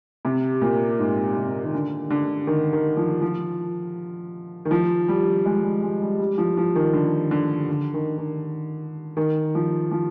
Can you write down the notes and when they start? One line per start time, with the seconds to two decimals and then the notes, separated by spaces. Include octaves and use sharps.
0.25 C3
0.61 A#2
0.99 G#2
1.36 C3
1.64 D#3
1.74 D3
2.10 D3
2.47 D#3
2.73 D#3
2.97 F3
3.22 F3
4.65 D#3
4.71 F3
5.08 G3
5.45 G#3
5.63 G3
5.83 G#3
6.02 G3
6.19 G3
6.38 F3
6.57 F3
6.75 D#3
6.93 D3
7.31 D3
7.69 D3
7.94 D#3
8.18 D#3
9.17 D#3
9.55 F3
9.91 F3